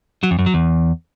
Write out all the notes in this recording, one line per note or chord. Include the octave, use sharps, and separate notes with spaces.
F#3
F2
F#2
F#3
E2